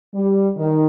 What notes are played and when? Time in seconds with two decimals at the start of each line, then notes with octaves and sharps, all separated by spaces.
0.14 G3
0.56 D#3